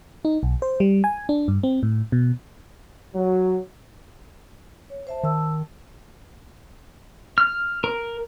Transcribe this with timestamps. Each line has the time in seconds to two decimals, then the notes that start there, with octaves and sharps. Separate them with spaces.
0.25 D#4
0.43 B1
0.62 C5
0.80 G3
1.04 G#5
1.29 D4
1.48 G2
1.63 C4
1.83 A2
2.12 B2
3.15 F#3
4.90 C#5
5.07 C5 E5 A5
5.23 D#3 A5 E6
7.38 F6
7.84 A#4